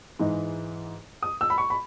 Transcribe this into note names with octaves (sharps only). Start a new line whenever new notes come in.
G#2 E3 G#3 D#4
D#6
E6
B5
C#6
B5